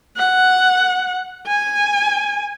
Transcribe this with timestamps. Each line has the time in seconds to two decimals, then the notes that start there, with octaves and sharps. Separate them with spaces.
0.17 F#5
1.47 G#5